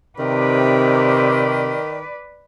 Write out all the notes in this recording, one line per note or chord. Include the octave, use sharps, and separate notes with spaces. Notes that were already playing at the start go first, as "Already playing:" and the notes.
C3 D#3 B4 D5